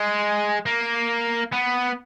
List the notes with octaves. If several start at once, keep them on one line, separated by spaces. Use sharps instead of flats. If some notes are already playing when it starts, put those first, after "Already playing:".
Already playing: G#3
A#3
B3